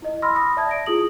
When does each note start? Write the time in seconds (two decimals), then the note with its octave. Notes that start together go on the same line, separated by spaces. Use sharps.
0.02 E4 D#5
0.22 B5 C6 E6 F6 A#6
0.35 B5 D#6 A#6
0.57 D5 E5 A5 D#6 G#6
0.69 A#6 D7
0.86 E4 F4 G#4 D#6 F#7